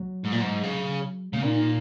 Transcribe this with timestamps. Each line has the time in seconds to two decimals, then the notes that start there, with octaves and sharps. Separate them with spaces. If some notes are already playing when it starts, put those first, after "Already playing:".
Already playing: F#3
0.25 G#2
0.33 A#2
0.41 G#2
0.64 C#3
1.33 C#3
1.43 A#2 D#4